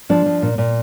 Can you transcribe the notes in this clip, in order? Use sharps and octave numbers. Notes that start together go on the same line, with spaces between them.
F3 D4
F3
A#2
A#2